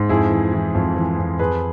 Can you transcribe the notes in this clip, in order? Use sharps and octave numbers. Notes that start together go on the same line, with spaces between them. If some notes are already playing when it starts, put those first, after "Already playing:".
Already playing: G#2
F2 E4 G#4
E3
E3
F2
E3
F2
F2 G#4 B4